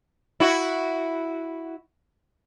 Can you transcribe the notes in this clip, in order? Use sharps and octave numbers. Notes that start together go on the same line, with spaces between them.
E4 F#4